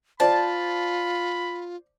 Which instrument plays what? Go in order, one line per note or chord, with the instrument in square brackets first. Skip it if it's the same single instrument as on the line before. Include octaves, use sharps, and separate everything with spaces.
[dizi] F4 [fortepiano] C5 D5 [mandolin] A5 [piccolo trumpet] B5